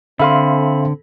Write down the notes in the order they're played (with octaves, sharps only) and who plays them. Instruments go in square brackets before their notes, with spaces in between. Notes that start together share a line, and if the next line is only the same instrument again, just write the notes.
[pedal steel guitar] D3 [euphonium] C4 [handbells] A4 B5 [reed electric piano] E5 F5 C6